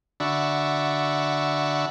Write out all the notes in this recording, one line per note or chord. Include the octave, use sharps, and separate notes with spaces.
D3 D4 F#4 E5 B5 C#6